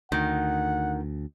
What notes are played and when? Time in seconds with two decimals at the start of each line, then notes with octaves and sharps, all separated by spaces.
0.12 D2 D#3 F#5